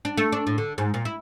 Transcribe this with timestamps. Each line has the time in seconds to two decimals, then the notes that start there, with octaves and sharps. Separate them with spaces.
0.05 D4
0.18 A3
0.32 D4
0.47 A2
0.58 D3
0.78 G#2
0.94 A#2
1.05 E4